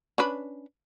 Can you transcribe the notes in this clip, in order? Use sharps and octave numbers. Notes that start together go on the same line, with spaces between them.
C#4 D4 B4